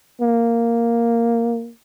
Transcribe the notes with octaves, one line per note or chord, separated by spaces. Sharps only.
A#3